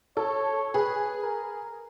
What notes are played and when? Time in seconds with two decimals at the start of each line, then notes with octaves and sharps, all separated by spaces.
0.17 A4 C#5
0.74 G#4 B4
1.22 A#4